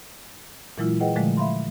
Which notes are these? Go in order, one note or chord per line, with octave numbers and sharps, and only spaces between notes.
A#2 E3 F#3 G#3 E4 F4
G#4 B4 D#5 F#5 G5
A#2 D3 F3 F#3 G#3 A3
E5 F5 B5 C6